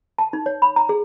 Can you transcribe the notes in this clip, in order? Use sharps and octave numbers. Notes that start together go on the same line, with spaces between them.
A5
D#4
C#5
B5
A#5
G#4